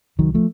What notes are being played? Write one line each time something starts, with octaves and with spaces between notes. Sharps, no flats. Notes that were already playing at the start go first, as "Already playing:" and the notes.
C2 D#3 F#3
F3 A3